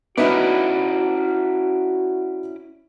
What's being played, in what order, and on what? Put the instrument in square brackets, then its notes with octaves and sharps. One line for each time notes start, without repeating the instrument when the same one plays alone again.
[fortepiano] B3 D#4 E5 [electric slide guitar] C#4 E4 D5 [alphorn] F#4